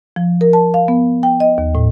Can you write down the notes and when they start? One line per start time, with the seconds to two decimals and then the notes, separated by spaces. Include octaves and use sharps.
0.16 F3
0.41 A#4
0.53 A5
0.74 F5
0.88 B3
1.23 G5
1.40 D#5
1.58 D#2
1.75 A2